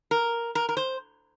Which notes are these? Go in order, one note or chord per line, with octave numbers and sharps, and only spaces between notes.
A#4
A#4
A#4
C5